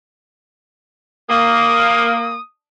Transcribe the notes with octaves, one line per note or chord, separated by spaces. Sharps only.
A#3 D#6